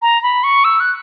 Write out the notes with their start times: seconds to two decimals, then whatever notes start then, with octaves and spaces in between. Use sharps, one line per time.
0.02 A#5
0.23 B5
0.44 C#6
0.64 E6
0.80 F#6